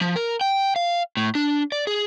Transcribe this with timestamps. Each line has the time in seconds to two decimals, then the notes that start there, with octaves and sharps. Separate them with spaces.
0.01 F3
0.16 A#4
0.41 G5
0.76 F5
1.17 A2
1.35 D4
1.72 D5
1.87 G#4